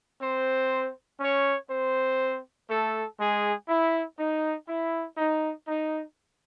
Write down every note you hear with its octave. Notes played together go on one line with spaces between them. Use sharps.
C4 C5
C#4 C#5
C4 C5
A3 A4
G#3 G#4
E4
D#4
E4
D#4
D#4